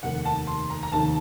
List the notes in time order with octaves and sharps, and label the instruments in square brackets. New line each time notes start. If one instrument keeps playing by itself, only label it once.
[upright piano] F1 D#2 D#3 [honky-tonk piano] F#5
[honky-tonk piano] A5
C6
A#5
A#5
[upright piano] F1 D#2 D#3 [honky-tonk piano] A5